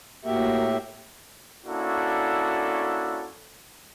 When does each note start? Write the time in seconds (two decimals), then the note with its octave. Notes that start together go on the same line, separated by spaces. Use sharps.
0.25 A2 A#3 F#4 G4 E5
1.65 A#3 C#4 D4 E4 F#4 A4